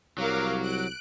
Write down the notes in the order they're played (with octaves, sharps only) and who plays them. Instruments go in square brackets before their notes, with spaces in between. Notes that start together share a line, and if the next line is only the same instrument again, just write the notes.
[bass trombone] C2 [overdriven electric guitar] F#3 [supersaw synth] A#4 F5 D6
[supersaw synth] F#6 D7